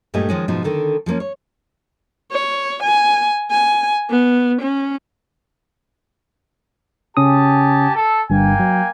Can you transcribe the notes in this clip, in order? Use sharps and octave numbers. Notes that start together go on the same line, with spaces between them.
G2 A#2 A3 G4 D#5 G#5
D#3 F3 G#3 C#4
G#2 B2 F3 G#3 D#4
D3 D#3 A4
F3 G3 A#3 C#4
C#5
C#5
G#5
G#5
B3
C#4
C#3 C#4 G4 G#5 A5 D#6
A4
G1 G2 A#3 G5 G#5
F#3